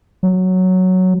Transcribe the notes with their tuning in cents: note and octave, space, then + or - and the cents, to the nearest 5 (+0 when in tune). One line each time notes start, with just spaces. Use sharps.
F#3 +0